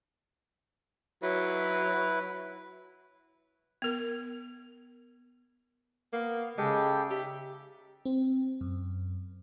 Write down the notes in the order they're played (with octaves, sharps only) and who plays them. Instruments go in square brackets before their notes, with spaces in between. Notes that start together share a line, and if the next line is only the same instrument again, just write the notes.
[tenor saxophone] F#3 [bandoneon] E4 B4
[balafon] B3 A#4
[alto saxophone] A#3 [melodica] B3 F5
[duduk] C#3 [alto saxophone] G#3 [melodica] G4 A4 G5
[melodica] D#4 E5 [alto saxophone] G4
[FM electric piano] C4
F#2